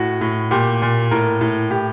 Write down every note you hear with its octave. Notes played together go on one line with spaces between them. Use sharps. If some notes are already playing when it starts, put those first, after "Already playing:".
Already playing: A2 F#4
A2
A#2 G4
A#2
A2 A#4
A2
A2 G4